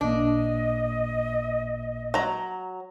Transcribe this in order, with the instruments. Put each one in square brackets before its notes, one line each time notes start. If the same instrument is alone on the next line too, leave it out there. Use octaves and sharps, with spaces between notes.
[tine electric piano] A1 A#2 A#3 [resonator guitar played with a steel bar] D4 [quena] D#5
[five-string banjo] F#3 A#5